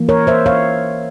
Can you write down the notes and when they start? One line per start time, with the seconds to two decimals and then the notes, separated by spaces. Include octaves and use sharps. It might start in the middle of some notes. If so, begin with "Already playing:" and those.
Already playing: E3 A#3
0.09 A#4 C#5
0.27 C5 E5
0.46 C#5 F5